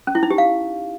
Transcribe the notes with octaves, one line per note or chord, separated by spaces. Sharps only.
C#4
E4
D#4
G4
F5